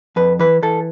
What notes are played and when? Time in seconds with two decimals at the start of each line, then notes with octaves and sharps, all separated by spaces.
0.16 F2 B4
0.39 E3 B4
0.63 E3 A4